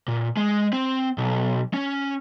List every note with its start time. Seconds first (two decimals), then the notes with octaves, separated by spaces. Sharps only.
0.08 A#2
0.37 G#3
0.73 C4
1.18 B1
1.74 C#4